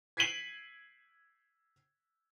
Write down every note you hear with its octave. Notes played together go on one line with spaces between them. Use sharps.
G#6 B6 C7 D7 D#7 F#7